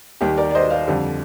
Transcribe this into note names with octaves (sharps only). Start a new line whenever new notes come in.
D#2 D#3 G3 G4
A#4 D5
D5
C5 D#5
D5 F5
F2 D3 G3